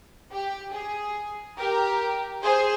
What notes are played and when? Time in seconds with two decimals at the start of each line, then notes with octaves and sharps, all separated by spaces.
0.32 G4
0.73 G#4
1.58 G4 A#4
2.43 G#4 C5